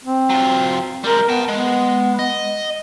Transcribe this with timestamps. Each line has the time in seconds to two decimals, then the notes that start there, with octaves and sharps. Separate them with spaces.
0.04 C4
0.30 F#3 F4
1.04 G3 G#3 A#4
1.29 B3 G5 A5
1.49 G#3 B3
2.19 D#5